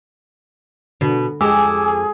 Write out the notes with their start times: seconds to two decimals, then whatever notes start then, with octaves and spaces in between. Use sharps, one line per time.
1.01 B2 D3
1.41 F2 G#3 G4 G#4 G#5 D6 E6